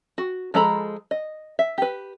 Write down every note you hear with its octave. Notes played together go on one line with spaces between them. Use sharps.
F#4
F3 G#3 A4 A#5 B5
D#5
E5
G4 B4